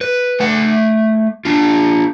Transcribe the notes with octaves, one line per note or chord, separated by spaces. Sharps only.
B4
A3 F#5
D4 F4